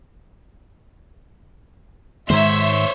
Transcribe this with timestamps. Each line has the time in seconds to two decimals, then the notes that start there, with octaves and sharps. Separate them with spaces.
2.30 G#2 D#3 G#3 C5 C#5 E5